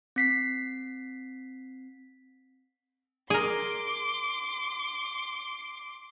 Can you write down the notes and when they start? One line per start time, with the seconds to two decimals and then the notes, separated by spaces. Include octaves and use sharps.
0.16 C4 B6 C7
3.30 G#4 A#4 C6 D6